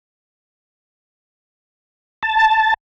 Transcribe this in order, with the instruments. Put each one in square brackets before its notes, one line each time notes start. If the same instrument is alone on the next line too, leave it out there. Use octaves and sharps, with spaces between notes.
[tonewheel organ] A5